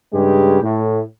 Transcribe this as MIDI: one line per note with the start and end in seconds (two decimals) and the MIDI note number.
0.13 0.58 43
0.13 0.58 49
0.13 0.58 56
0.13 0.58 67
0.63 1.01 45